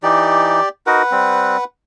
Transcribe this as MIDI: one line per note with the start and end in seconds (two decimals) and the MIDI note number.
0.03 0.61 52
0.03 0.61 63
0.03 0.69 67
0.03 0.69 74
0.87 1.02 63
0.87 1.02 66
0.87 1.02 70
0.87 1.64 71
0.87 1.64 78
1.12 1.57 55
1.12 1.57 60